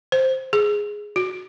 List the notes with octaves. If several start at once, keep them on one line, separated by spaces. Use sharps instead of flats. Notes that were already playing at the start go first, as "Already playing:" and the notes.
C5
G#4
F#4